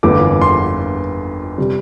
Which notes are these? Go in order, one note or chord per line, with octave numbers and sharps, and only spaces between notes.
G1 F2 E3 A#3 D6
C6
C3 G3